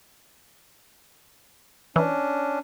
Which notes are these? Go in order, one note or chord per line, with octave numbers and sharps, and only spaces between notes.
E3 C#4 D4